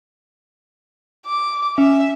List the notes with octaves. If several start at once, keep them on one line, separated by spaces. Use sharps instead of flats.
D6
C#4 E5